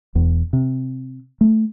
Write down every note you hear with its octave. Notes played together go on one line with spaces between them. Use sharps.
E1 E2
C3
A3